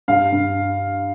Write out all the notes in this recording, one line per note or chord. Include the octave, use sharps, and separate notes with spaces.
G2 F5
G2